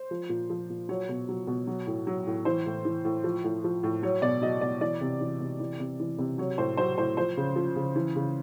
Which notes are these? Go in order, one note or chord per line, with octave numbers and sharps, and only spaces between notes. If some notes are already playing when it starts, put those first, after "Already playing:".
Already playing: C5
F3
A#2
F3
A#2
F#3 C#5
B2
F#3
B2
F#3
A2
F#3
A2
E3 C5
A2
E3
A2
F3
A2
F3
A2
F#3 C#5
B2 D5
F#3 D#5
B2 D5
E3 D5
C3
E3
C3
E3
C3
E3
C3
F#3 C#5
A2 C5
F#3 C5
A2 C5
F3 C5
C#3
F3
C#3
E3
C#3